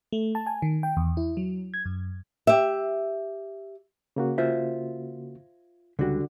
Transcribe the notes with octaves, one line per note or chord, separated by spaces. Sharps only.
A3
A5
G#5
D#3
G5
E2
E4
F#3
G#6
F#2
G4 E5
C#3 A#3 F#4
F4 C5 E5
C#2 D3 G3 F#4